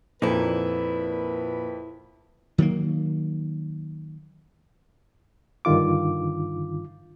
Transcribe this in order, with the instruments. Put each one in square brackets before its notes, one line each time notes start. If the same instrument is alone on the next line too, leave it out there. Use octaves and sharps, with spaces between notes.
[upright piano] F2 [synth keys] A#2 [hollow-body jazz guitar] D#4 E4 [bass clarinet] B4
[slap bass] D#3 F#3 G#3 A#3
[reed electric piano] G2 D3 D#3 F4 D6